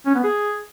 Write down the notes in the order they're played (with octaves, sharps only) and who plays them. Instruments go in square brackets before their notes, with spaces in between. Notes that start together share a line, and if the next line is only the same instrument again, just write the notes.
[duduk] C#4
B3
G#4